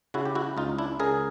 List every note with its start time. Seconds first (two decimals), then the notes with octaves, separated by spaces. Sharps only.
0.14 C#3 E4 F#4
0.25 G4
0.35 E4 F#4
0.57 C#2 D#4 F4
0.78 D4 E4
1.00 C#3 G#4 A#4